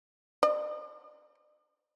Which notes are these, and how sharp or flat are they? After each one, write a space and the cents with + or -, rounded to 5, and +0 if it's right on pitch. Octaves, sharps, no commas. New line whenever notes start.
D5 +45